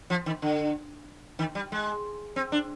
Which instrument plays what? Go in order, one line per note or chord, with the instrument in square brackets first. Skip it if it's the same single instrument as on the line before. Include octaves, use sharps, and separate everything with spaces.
[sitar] F3
D#3
D3
D#3
G3
G#3
C4
D4